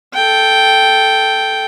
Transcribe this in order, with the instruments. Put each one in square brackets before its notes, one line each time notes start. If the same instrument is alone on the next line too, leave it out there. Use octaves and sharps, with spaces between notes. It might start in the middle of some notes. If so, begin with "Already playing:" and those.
[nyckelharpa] A4 G5